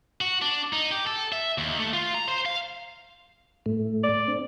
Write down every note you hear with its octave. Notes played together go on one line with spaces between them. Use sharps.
F#4
D4
D#4
G4
A4
E5
D#2
A3
F4
A#5
C5
F5
A2 A3
D5
C4 D4